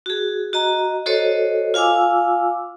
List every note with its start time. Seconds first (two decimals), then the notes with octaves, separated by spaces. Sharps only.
0.06 F#4 G#4
0.53 F#4 D#5 A#5
1.06 F#4 A4 C5 C#5 D#5
1.74 F4 F5 G#5 D6 E6